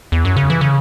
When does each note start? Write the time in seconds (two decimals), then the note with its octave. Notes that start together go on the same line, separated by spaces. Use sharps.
0.12 E2
0.25 F#2
0.36 C#3
0.50 E3
0.61 C#3